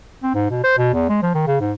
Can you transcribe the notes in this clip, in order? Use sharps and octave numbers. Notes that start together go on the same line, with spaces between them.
C4
G#2
B2
C5
B2
E2
G#3
F3
D#3
C#3
G#2